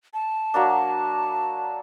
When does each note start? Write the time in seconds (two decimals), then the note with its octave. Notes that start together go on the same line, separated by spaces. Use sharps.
0.14 A5
0.54 F#3 A#3 D4